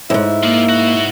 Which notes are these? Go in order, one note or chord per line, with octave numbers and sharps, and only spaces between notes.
F2 G#2 E4
A#3 F4 D5
B3 F#4